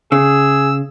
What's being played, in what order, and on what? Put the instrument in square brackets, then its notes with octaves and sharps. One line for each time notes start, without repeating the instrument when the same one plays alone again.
[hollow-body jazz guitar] C#3 [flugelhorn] G#4 [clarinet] E6